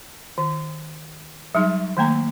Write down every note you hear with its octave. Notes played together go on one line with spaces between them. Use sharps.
D#3
F#3 G3 D#4 G#4
D#3 A3 A#3 A#5